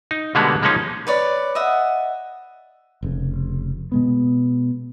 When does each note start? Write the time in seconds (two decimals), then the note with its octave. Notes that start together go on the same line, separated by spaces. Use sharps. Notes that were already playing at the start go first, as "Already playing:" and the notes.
0.11 D#4
0.35 B2 D3 G3 G#3 A#3 B3
0.62 F3 G#3 A#3 C#4 D#4
1.07 B4 C#5 D5
1.55 D#5 E5 F#5
3.03 F1 C#3
3.92 B2 G#3 B3